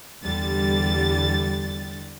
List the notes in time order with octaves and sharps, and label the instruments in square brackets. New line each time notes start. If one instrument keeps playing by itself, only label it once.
[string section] E2 D3 G3 A6